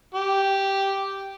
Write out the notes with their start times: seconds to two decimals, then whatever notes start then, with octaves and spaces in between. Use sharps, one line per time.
0.14 G4